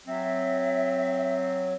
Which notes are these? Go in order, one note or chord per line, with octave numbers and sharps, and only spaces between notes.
F#3 C4 E5